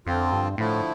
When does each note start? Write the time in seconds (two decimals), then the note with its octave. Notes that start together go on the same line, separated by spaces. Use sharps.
0.06 F2 D3 F3 C4 F4
0.32 G2
0.58 A2 D3 F3 A3 E4